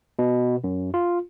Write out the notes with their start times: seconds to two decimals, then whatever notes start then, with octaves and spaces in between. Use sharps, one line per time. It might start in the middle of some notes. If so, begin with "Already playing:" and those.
0.19 B2
0.64 F#2
0.94 F4